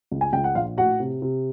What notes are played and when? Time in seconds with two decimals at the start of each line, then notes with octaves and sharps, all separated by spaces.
0.12 C#2
0.21 G#5
0.33 C#2 G5
0.44 F#5
0.55 A#1 F4 F5
0.77 A2 F#4 F#5
1.00 C3
1.22 C3